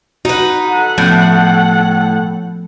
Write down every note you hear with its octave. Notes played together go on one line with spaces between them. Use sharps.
D#4 F#4 B4
A4 F#5
A2 F3 B3 C#4